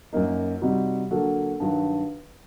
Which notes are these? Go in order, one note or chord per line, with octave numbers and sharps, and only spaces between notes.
F#2 F#3 A#3 D#4
C3 G3 C4 D#4 F#4
D3 F#3 A#3 F#4 A4
G2 D#3 F#3